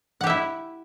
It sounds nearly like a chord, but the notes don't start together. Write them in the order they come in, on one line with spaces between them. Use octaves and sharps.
F#5 G4 E5 E4